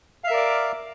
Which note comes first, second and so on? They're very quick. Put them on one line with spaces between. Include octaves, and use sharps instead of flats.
F5 E5 A#4 D5 D6